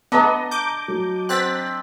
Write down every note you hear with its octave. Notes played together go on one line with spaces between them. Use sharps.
B3 D4 D#5 A5 A#5
D6 G6
F#3
C4 F#6 A6 B6